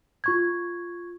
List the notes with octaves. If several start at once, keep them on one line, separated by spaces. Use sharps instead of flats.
F4 C#6 G#6